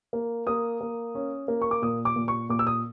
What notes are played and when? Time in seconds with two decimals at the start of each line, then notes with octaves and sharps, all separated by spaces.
0.13 A#3
0.47 A#3 D#6
0.81 A#3
1.15 C#4
1.48 A#3
1.62 C#6
1.71 D6
1.82 A#2 D#6
2.05 D6
2.16 A#2
2.28 C#6
2.49 A#2 D6
2.59 E6
2.67 D#6